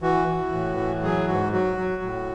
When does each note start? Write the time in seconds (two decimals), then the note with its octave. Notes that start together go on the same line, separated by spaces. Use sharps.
0.02 E3 F#4
0.28 E3
0.52 A2
0.77 E3
1.03 F#3 G#4
1.28 G#2 F#4
1.52 F#3 F#4
1.77 F#3
2.02 A2